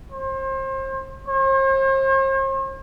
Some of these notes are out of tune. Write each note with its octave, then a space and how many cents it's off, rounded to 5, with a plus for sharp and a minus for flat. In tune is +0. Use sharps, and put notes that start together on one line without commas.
C5 +35
C5 +45